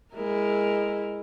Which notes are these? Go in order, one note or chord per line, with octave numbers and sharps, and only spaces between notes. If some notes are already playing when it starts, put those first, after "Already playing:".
G#3 E4 A#4